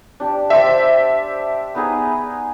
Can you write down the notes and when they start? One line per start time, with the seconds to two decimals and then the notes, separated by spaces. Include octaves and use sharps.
0.20 D4 G4
0.50 G4 C5 D5 E5
1.75 B3 D#4 G#4